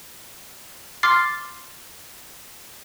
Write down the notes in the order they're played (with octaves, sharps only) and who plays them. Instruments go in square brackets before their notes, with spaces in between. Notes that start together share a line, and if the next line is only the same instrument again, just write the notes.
[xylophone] C6 D6 F6 A6 C7